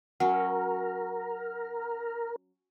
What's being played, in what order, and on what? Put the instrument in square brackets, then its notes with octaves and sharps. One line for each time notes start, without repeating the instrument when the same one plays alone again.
[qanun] F#3 C#4 [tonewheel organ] A#4 [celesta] F#5